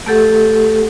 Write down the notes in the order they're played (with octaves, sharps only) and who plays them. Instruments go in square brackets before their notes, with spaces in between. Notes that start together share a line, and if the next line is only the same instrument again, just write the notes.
[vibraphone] A3 G4 A4 F#5